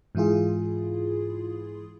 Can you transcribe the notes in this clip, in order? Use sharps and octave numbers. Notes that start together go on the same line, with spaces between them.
G#2 E3 E4 F4 G#4